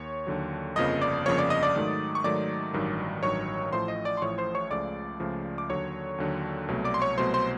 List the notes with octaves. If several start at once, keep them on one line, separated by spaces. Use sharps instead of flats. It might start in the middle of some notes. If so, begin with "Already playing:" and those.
Already playing: D#2 C#5 C#6
D#2 D3 F#3
G1 F2 C#3 F3 A#3 D#5 D#6
D5 D6
G1 F2 C#3 F3 A#3 C#5 C#6
D5 D6
D#5 D#6
D5 D6
G#2 D#3 F#3 A3
C#6
G#2 D#3 F#3 A3 D5 D6
A1 G2 D#3 F#3
A1 G2 D#3 F#3 C#5 C#6
A1 A2 F3 A3 C5 C6
D#5 D#6
D5 D6
C6
A1 A2 F3 A3 C#5 C#6
C5 C6
C#5 C#6
C#2 C#3 F3 A3 D5 D6
C#2 C#3 F3 A3
D6
D#2 D3 F#3 C#5 C#6
D#2 D3 F#3
C2 B2 F#3 A3
D5 D6
C6
C#5 C#6
C2 B2 F#3 A3 C5 C6
C5 C6